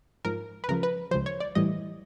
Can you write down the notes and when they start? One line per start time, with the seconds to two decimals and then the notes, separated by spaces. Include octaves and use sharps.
0.25 G#2 F3 A#4
0.64 B4
0.69 C#2 C#3 F3 A#4
0.83 B4
1.11 C#2 C#3 F3 C5
1.26 C#5
1.40 D5
1.55 A2 E3 G3 D#5